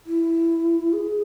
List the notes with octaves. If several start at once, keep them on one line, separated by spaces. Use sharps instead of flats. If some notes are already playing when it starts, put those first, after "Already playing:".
E4
G#4